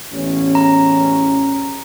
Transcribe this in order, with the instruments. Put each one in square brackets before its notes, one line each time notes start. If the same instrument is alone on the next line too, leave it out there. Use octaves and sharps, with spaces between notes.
[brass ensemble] A1 E2 C#4
[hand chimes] A#5